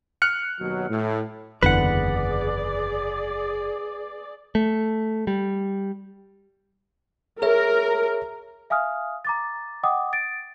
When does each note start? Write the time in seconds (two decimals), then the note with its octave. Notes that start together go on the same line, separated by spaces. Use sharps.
0.22 F6 F#6 C#7
0.60 D#2 B2 F#3
0.89 A2
1.63 F#1 E2 D3 G#4 B4 D5 F#5
4.55 A3
5.27 G3
7.42 G#4 A#4 C#5 E5
8.70 E5 F5 G#5 D#6 F6
9.25 A#5 D6 A6
9.83 D#5 F#5 G5 D6 D#6
10.13 A6 D7